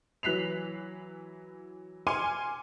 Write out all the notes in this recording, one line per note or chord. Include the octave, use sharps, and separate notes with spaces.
E3 F#3 F#6 B6 C7 F7
G#5 C6 D6 F6 C#7 D#7